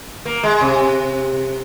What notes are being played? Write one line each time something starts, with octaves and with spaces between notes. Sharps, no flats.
A#3
G#3
C3